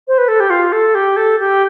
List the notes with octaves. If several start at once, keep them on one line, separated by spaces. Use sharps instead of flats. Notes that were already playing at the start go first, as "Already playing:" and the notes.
C5
B4
A4
G4
F4
A4
G4
A4
G4